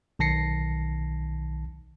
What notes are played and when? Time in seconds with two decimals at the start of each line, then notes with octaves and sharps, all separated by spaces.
0.19 B1 D#3 A5 A#6 C7 C#7